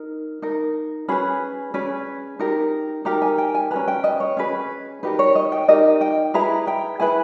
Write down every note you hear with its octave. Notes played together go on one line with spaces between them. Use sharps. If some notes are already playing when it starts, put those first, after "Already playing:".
Already playing: D#4 A#4
D#4 A#4
C#4 G#4 B4 B5
C#4 G#4 B4
D#4 G4 A#4
D#4 G4 A#4 A#5
G#5
G5
G#5
C#4 G#4 B4 A#5
G5
D#5
C#5
C#4 G#4 B4
D#4 G4 A#4 B4
C#5
D#5
G5
D#4 G4 A#4 D#5
G5
E4 G#4 B4 A#5
G5
E4 G#4 B4 G#5